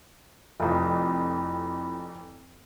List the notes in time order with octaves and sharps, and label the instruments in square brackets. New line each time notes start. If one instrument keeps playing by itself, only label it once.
[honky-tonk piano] F1 F2 [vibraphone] E4 B5